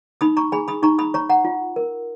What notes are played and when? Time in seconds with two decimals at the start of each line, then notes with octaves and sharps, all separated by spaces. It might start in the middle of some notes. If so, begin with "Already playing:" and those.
0.21 D#4 B5 D#6
0.37 A#5 C#6
0.52 G#4 G#5 B5
0.68 B5 D#6
0.83 D#4 A#5 C#6
0.99 B5 D#6
1.14 C#5 A#5 C#6
1.29 F#5 A#5
1.45 F4
1.76 A#4